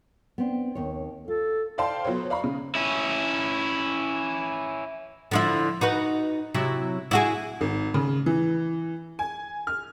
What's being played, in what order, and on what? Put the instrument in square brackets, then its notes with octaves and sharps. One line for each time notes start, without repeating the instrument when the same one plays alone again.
[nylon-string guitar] B3 C4 D4
D#2 C#5
[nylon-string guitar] F4 [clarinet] A4
[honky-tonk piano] C5 D5 F5 G5 A5 C6
F#3 B3 A4 C5 C#5
D5 F5 A#5 B5 C#6
C#3
[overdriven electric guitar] C#4 E4
[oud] D3 F3 E4
D#4 F#4 B4
C3 F#3 E4
E4 F#4 G#4
[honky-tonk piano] G#1
C#3
E3
G#5
F6